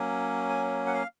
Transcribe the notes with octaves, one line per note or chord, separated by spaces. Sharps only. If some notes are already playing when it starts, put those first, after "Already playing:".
Already playing: F#3 A#3 C#4
G#5
F#5
F5